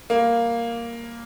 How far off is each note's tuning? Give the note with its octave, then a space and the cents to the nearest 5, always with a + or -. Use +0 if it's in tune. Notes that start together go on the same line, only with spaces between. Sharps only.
G3 +20 A#3 +0